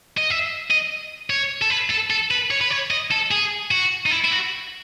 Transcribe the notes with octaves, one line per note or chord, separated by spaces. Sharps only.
D#5
E5
D#5
C#5
A4
B4
A4
A4
B4
C#5
B4
C#5
D#5
A4
G#4
F#4
D#4
E4
E4
F#4